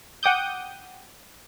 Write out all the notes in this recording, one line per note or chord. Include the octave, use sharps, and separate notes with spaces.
F#5 G5 D6 D#6 G6